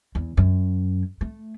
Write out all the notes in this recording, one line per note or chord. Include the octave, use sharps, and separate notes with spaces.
E2
F#2
A3